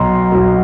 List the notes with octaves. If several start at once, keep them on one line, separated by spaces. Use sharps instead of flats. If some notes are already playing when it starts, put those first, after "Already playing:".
Already playing: B1 B2 A#5 C6
B1 B2